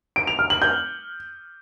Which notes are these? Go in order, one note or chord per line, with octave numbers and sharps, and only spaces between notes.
D7
F7
F6
F#7
G6